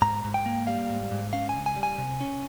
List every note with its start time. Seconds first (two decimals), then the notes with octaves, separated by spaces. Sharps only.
0.02 G#2 A#5
0.24 G#2
0.34 G5
0.46 A#3
0.67 G3 F5
0.90 G#2
1.11 G#2
1.33 C#4 F5
1.49 G#5
1.55 C#2
1.66 G#5
1.76 G3
1.83 G#5
1.98 C3
2.21 C#4